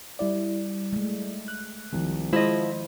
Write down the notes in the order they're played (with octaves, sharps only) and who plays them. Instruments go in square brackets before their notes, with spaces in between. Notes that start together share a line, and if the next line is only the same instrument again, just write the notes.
[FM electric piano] G3 E4 D5
[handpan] G#3 A3
[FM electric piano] F#6
[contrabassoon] C2 [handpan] D#3 F3
[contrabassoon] F3 [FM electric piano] G#3 [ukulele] E4 D#5 [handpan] C5